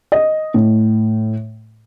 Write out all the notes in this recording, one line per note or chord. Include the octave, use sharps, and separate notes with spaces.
D#5
A2